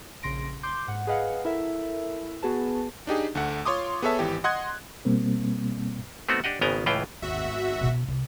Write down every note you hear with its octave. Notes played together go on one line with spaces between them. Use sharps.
A#1 C#3 C6 A#6 D7
C6 D6 G6
G#2 F#5
G#4 B4 D#5 F5 F#5
E4 A4 A#4 E5
B3 F#4 G#4 B4 A5
D4 D#4 G4 G#4
D2 A3 F#5
F4 C#5 C6 D6 D#6
B3 G#4 A4 C#5 E5 A5
G#1 E3 G4
D#5 F#5 C6 D#6 F#6 G#6
B2 G3 A#3 C4
A3 B3 C4 D#4 F#4
D4 G4 D#5 F#5
G#1 C#3 B3 G5 G#5 A#5
C#2 A2 E3 F4 B4 G5
G#1 D#2 F#4 E5
B3
B2 F4
C2